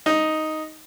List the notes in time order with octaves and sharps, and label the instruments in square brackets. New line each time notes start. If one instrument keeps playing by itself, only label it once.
[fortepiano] D#4